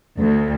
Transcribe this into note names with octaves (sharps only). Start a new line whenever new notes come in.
D2